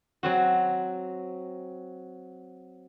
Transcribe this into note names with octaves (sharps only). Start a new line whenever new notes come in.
F#3 C4 F#4